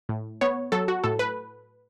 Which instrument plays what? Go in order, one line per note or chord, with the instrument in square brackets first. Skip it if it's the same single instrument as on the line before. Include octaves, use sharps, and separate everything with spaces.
[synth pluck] A2
B3 C#5
F#3 A4
F#4
A2 A4
B4